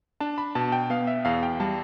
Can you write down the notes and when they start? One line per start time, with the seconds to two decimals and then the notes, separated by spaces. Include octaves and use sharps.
0.20 D4 A5
0.38 B5
0.55 B2 A5
0.72 G5
0.90 B3 F5
1.07 E5
1.25 E2 F5
1.43 G5
1.60 G3 A5